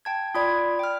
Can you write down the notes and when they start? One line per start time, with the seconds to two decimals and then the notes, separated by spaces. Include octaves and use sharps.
0.05 G5 A5 G#6
0.35 F4 D5 B5 D#6 G#6
0.79 G5 F6